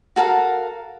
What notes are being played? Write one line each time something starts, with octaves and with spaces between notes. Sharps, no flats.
F#4 A4 A#4 F5